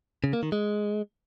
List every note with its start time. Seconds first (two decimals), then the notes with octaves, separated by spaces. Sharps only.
0.24 C#3
0.33 A#3
0.43 D#3
0.52 G#3